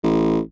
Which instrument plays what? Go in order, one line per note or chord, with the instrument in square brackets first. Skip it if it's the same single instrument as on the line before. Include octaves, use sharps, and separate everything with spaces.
[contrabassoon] A1